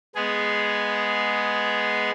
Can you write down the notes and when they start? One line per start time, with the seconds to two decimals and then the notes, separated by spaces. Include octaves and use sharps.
0.15 G#3 B3 G#4